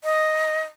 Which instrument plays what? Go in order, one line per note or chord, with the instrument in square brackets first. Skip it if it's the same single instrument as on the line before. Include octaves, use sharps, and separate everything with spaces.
[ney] D#5